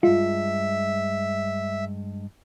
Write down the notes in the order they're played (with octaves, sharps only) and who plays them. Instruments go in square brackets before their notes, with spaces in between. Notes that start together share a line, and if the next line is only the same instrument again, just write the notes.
[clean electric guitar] G2 G#3 [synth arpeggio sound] F4 [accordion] E5